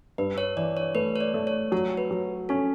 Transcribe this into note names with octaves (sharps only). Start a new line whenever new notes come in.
G2 B4
C#5
E3 D5
C#5
A3 B4
C#5
D5
A3
C#5
F#3 C#5
B4
F#3
C#4 A4